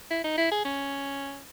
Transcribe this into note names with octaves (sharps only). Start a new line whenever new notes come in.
E4
D#4
E4
G#4
C#4